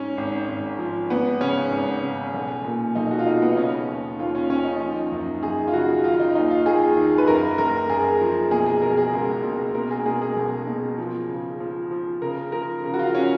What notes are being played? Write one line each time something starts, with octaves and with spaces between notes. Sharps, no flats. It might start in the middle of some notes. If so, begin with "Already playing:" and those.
Already playing: G#2 C#4
G#1
G#1
F3
G#1 B3
C#3 C#4
G#1
C#3
B1
A#2
B1 D#4
F#4
F4
B1 D#4
B3
D#4
C#3 C#4
D#2
D#2 F4
C#4
D#2 C#4
D#4
F3
F#2
F#2 G#4
F4
C#3 F#4
D#3 F4
D#4
D#2 D#4
F4
D#2 G#4
D#3
B4
F#2 A#4
F#1 A#4
F#1 G#4
F3
B2 G#4
G#4
B2 A#4
G#4
C#2
B2
B2 A#4
G#4
B2 G#4
G#4
B1
B2
F3
C#3
F3
F3
C#3 A#4
F3 A#4
C#3
F#4
F4
C#4